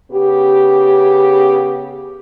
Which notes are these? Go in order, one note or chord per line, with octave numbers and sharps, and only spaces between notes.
C#3 B3 G4